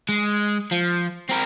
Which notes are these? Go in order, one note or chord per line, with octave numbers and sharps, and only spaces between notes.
G#3
F3
C4 A#4